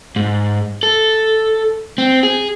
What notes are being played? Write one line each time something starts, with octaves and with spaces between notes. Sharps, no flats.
G#2
A4
C4
G#4